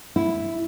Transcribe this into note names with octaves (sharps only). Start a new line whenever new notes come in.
E4